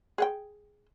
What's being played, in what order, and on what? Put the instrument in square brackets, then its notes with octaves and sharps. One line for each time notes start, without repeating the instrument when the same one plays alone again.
[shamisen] G#4 F#5 G5